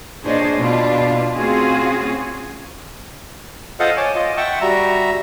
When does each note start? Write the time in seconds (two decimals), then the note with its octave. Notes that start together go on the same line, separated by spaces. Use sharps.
0.24 A#2 D4 G#4 C5 C#5 D#5
0.59 B2 D4 F4
1.34 A3 C4 C#4 F4 F#4 G#4
3.80 F4 A4 C5 D#5 F5 F#5
3.97 C#5 G#5 A5 D6
4.15 F4 D#5
4.37 E5 F#5 G5 A5 C#6
4.61 G3 F#4 E5 A#5